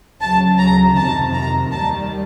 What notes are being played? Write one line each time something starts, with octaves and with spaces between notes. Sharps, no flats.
D2 C#3 F#3 A5
A#5
F2 C3 D#3 A5
A#5
D#2 D#3 G3 A5